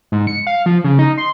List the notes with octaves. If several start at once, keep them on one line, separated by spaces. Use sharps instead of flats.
G#2
C#7
F5
F3
C#3
D#4
C6